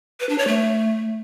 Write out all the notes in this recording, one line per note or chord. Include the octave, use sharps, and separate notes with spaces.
B4
D4
C#5
A3